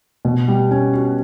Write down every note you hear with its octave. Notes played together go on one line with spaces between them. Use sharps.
B2
G3
C#4
F#4